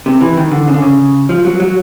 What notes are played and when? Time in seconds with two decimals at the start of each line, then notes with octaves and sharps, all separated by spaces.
0.06 C3
0.21 E3
0.37 D#3
0.51 D3
0.68 C#3
0.74 D3
0.82 C#3
1.29 F3
1.45 F#3
1.60 F#3